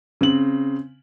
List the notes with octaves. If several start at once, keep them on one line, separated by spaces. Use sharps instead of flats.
C#3 C4 F#7